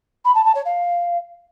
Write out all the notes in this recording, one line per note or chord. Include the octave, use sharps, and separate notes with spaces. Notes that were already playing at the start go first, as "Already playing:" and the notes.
B5
A5
A5
C#5
F5